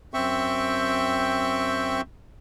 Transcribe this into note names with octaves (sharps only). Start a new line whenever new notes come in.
F#2 C4 E5 G5 C#6